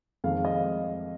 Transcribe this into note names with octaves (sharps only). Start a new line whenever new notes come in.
F2 D#3 G#3 F5
D#5